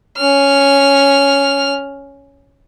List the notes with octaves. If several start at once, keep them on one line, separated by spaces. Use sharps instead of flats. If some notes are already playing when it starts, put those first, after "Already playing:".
C#4 F6